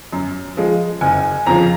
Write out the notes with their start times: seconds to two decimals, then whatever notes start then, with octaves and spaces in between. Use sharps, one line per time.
0.13 F#2
0.57 F3 G#3
1.01 F#1 G#5
1.46 F2 C#3 F3 A#5